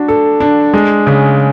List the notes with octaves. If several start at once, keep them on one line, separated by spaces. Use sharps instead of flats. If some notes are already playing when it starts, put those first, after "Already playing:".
Already playing: D4 F#4
A4
D4
G#3
C#3